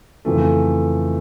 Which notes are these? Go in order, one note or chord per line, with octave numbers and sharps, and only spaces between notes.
F2 C#3 E3 A3